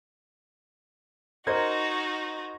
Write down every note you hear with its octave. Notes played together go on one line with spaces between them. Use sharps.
D#4 F#4 A#4 C5 D#5 G#6